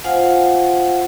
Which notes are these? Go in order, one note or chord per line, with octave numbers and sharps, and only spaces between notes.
F4 C5 F5 F#5 G#5